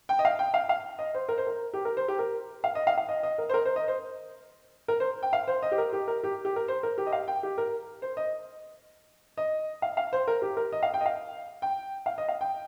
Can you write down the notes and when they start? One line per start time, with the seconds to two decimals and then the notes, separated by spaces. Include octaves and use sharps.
0.09 G5
0.19 D#5
0.25 F5
0.39 G5
0.54 F5
0.69 F5
0.99 D#5
1.14 C5
1.29 A#4
1.38 C5
1.47 A#4
1.74 G4
1.85 A#4
1.97 C5
2.08 G4
2.19 A#4
2.64 F5
2.75 D#5
2.87 F5
2.97 F5
3.09 D#5
3.23 D#5
3.38 A#4
3.49 C5
3.54 A#4
3.65 C5
3.76 D#5
3.88 C5
4.88 A#4
5.00 C5
5.23 G5
5.33 F5
5.48 C5
5.63 D#5
5.72 G4
5.78 A#4
5.93 G4
6.08 A#4
6.24 G4
6.45 G4
6.56 A#4
6.68 C5
6.83 A#4
6.98 G4
7.06 D#5
7.12 F5
7.28 G5
7.43 G4
7.58 A#4
8.02 C5
8.17 D#5
9.37 D#5
9.82 F5
9.97 F5
10.13 C5
10.28 A#4
10.42 G4
10.57 A#4
10.72 D#5
10.83 F5
10.94 G5
11.01 D#5
11.06 F5
11.62 G5
12.06 F5
12.18 D#5
12.28 F5
12.41 G5